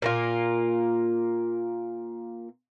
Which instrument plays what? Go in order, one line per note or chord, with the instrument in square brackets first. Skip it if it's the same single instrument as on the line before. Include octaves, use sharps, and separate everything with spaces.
[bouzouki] A#2 A#3 F4